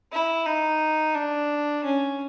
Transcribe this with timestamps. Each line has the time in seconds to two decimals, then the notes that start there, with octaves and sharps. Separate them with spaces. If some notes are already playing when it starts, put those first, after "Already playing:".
0.12 E4
0.46 D#4
1.14 D4
1.84 C#4